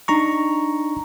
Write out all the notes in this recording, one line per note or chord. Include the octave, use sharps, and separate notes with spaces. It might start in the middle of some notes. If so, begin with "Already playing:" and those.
D4 D#4 A#5 C#6